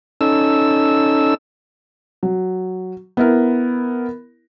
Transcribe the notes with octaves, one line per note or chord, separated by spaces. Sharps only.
C#4 D#4 A4 E6
F#3
B3 E4 A#4